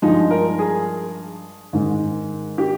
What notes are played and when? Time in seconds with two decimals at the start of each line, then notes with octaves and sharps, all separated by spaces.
0.02 G2 F3 G#3 D#4
0.31 A#4
0.59 G#4
1.73 G#2 D#3 G#3
2.58 G4